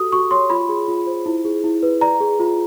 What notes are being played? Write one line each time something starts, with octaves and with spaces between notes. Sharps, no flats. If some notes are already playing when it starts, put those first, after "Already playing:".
Already playing: F#4 G4 A4 D#6
F#4 C#6
C#5 C6
F4 B5
G#4
F4
C5
E4
G#4
E4
B4
D5 A#5
G#4
F4